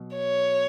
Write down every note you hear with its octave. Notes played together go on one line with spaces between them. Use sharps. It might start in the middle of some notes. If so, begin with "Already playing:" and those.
Already playing: B2 F#3
C#5